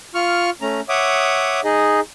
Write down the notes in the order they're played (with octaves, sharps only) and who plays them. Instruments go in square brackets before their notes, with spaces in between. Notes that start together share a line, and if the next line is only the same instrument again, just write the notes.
[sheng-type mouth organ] F4 C#6 F6
A3 C#4 A#5
C#5 E5 F#5 D6 D#6
D#4 G#4 D#5